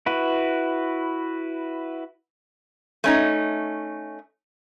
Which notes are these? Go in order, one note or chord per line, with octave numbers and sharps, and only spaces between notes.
E4 F#4 B4
A3 C#4 D#4